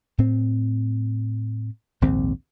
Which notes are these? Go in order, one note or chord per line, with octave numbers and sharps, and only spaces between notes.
A2 C4
A#1 D#2 G#2 C4